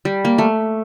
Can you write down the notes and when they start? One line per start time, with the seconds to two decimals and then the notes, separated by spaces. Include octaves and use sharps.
0.05 G3
0.25 A#3
0.38 A3